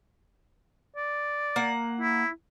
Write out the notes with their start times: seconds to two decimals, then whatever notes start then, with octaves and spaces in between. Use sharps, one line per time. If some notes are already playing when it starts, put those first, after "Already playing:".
0.96 D5
1.56 A#3 F#5
2.01 E4